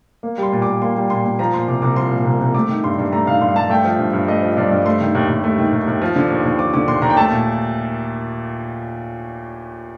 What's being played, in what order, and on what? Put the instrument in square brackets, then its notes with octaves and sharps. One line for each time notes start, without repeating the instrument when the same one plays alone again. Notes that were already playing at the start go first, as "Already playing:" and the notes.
[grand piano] A#3
G3 C6
A#2
D6
A#2
A#3 C6
G3
A#2 C6
A#2
F3 A#5
A#2 C6
C2 D6
C2 D6
F3 C6
A#2
C2
C2
A3 D6
D#3
G2 C6
G2
A3 A#5
D#3 F5
G2 C6
G2 A5
A3 G5
F3
G2
G2
A3 D#5
F3
G2 D5
G2
A3 C6
D#3
D#2
D#2
A3
D#3
D#2
D#2
F3
D3
D#2
D#2
F3 D6
D3 D6
D#2 C6
D#2 A#5
G5
A3 A5
A#2